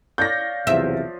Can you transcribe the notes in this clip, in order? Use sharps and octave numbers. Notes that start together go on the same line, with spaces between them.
C#5 D5 F5 G6 A#6
B1 E2 C3 F3 E5